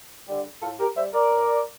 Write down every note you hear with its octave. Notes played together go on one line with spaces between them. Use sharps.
D3 G3
A2 F4 A4
G4 A#4
G3 C5 E5
A#4 D5
A2